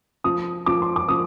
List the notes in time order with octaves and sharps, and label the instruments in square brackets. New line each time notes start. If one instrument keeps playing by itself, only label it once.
[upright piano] F3 [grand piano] D#6
[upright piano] F3 [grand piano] D6
[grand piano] C6
D6
[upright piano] F3 [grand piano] D#6